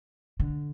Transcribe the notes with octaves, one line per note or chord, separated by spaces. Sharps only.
D3